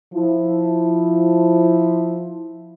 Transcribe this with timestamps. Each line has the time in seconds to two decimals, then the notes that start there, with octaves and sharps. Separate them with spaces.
0.14 F3 E4